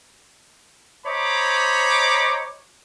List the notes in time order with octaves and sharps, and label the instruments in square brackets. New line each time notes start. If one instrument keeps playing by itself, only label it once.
[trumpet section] C5 C#5 D#5 A#5 B5 D6